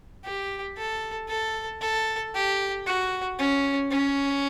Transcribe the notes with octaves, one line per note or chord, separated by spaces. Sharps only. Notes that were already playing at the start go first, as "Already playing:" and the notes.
G4
A4
A4
A4
G4
F#4
C#4
C#4